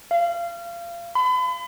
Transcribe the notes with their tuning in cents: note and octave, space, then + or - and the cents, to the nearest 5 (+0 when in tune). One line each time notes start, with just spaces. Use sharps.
F5 -30
B5 +40